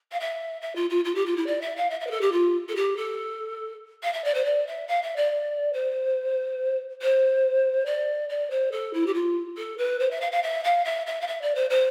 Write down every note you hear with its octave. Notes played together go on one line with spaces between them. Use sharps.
F5
E5
E5
F4
F4
F4
G4
F4
E4
D5
E5
F5
E5
E5
B4
A4
G4
F4
A4
G4
A4
F5
E5
D5
C5
D5
E5
F5
E5
D5
C5
C5
D5
D5
C5
A4
E4
G4
F4
A4
B4
C5
E5
F5
F5
E5
F5
E5
E5
F5
E5
D5
C5
C5